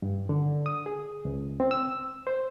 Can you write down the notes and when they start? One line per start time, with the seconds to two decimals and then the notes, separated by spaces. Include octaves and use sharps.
0.02 G2
0.29 D3
0.66 D#6
0.86 G#4
1.25 C#2
1.60 C4
1.71 E6
2.27 C5